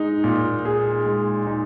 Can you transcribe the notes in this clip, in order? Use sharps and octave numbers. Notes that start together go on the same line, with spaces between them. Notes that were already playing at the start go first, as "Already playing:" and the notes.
Already playing: G#3 D#4
A#2
G#4
G#3
D#4